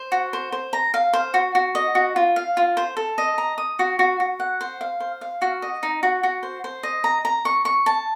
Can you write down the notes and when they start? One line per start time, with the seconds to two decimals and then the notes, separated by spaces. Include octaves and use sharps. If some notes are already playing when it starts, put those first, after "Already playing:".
Already playing: C5
0.12 F#4
0.33 C5
0.52 C5
0.73 A#5
0.94 F5
1.13 C5
1.34 F#4
1.55 F#4
1.75 D#5
1.95 F#4
2.16 F4
2.36 F5
2.57 F4
2.77 C5
2.97 A4
3.18 D#5
3.38 A#5
3.58 D#6
3.79 F#4
3.99 F#4
4.20 F#4
4.40 F#5
4.61 C5
4.81 F5
5.00 C5
5.21 F5
5.42 F#4
5.62 D#5
5.83 D#4
6.03 F#4
6.23 F#4
6.43 C5
6.64 C5
6.83 D#5
7.04 A#5
7.25 A#5
7.45 C#6
7.65 C#6
7.86 A5